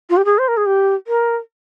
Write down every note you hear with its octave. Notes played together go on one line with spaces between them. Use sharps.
F4
G4
G#4
C5
A#4
G#4
G4
A#4